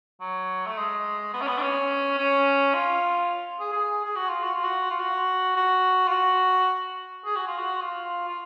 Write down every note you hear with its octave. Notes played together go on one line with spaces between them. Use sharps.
F#3
A3
G#3
B3
C#4
B3
D4
C#4
C#4
F4
G#4
G#4
G#4
F#4
F4
F#4
F4
F#4
F4
F#4
F#4
F4
F#4
G#4
F#4
F4
F#4
F4
F4